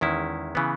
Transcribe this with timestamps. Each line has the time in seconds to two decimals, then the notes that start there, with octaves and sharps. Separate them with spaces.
0.01 E2 D#3 G#3 C#4 E4
0.55 C#3 E3 B3